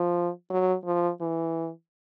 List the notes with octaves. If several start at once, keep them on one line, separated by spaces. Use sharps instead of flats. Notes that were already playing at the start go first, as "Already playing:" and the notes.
Already playing: F3
F#3
F3
E3